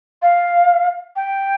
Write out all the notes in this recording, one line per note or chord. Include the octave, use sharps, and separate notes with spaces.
F5
G5